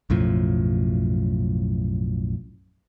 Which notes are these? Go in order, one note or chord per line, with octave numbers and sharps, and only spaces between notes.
B1 F#2 A2 F3